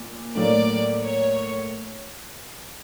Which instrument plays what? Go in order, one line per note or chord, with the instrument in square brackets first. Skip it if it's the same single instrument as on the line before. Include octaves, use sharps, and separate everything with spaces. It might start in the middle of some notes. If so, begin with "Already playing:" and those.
Already playing: [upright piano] A#2
[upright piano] A2 F#3 A#3 [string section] D5
[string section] C#5